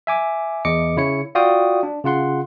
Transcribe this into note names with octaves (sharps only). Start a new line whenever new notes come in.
E5 G#5 D6
E2 D#5 D6 C#7
C#3 E4 C#5 C#7
F4 F#4 D5 F5 G5 D#6
D4
C#3 F4 F#5 C6